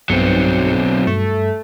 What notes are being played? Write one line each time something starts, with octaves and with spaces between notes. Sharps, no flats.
B1 G2 F#3 C4 C#7
G2 A3